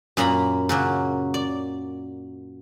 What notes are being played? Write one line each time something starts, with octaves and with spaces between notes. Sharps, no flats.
F#2 A#2 A#3 A#5 B5
C#3 F#3 A#3
D5